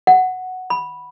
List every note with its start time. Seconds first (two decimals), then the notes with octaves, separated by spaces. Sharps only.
0.07 F#5
0.70 B5